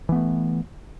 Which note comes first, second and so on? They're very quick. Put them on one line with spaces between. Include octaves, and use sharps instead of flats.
E3 B3 A3